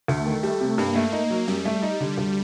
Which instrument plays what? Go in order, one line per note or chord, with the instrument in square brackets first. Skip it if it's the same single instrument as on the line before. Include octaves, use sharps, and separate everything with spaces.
[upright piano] D2 [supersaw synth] A3
[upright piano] D#3
[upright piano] G3 [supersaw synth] A3
[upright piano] C3
[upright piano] G2 [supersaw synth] A#3
[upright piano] A3
D#4
F#3
[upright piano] F#2 [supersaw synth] G3
[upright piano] A3
D#4
D3
D2